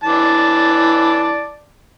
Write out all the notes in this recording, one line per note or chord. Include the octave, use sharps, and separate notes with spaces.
E3 D5 A5